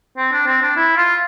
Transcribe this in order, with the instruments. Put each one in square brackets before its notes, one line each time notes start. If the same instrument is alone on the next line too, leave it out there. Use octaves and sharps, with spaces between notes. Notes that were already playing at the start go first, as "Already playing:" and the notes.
[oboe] C4
D4
C4
D4
E4
F4